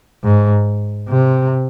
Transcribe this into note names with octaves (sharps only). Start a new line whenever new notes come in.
G#2
C3